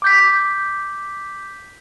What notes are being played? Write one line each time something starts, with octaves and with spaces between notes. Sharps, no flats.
D6 G6 B6